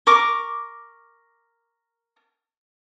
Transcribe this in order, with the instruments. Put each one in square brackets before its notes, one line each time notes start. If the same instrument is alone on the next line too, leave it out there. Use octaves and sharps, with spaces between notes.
[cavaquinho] A#4 C#6 D6